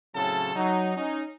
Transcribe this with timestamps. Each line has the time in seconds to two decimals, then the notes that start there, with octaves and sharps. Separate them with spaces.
0.15 A2 C#3 F#3 C4 A4 A5
0.55 F#3 D#4
0.97 C#4 D#4